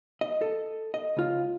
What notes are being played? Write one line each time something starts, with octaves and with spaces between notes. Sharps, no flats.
D#5
A4
D#5
C#2 F4